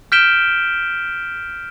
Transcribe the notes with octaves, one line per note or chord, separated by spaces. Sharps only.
F6 G6 B6 D7 E7 G7